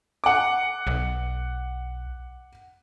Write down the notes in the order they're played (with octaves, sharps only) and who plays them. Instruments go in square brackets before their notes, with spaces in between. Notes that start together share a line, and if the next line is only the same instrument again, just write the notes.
[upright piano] F#5 D6
[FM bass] B1